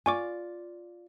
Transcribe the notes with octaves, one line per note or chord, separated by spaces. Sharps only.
F4 D5 G#5 C#6 D6